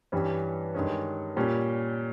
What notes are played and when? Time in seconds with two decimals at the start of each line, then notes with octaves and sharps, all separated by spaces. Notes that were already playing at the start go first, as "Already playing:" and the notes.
0.12 G2 E3 G3 C#4
0.75 G2 D#3 G#3 C#4
1.36 A#2 G3 C#4